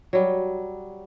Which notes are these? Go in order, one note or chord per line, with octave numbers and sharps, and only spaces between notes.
F#3 G3